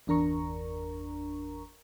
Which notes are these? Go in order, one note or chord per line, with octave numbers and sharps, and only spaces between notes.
G1 E2 D4 A#4 A#5 C#6